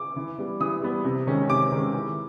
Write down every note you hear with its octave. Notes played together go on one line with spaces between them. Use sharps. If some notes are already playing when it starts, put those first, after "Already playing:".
Already playing: D6
E3
G3 B3
E3 D#6
G3 B3
C3
D#3 G#3 C#4
C3 D6
D#3 G#3 C#4
E3